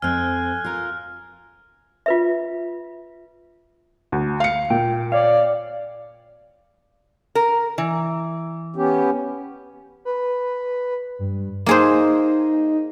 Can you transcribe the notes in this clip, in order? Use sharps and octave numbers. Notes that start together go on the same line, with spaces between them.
F2 C4 G#5 F6 F#6
F4 A#4
F4 B4 E5
D2
F5 C#7
A#2 G5
C#5 D5 F5
A#4
E3
B3 C#4 G4
B4
G2
A#3 D#4 G#4 C5